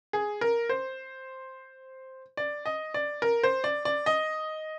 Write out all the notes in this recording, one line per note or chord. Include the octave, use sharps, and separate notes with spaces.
G#4
A#4
C5
D5
D#5
D5
A#4
C5
D5
D5
D#5